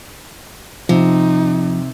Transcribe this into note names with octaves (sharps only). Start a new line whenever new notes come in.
C3 F3 D#4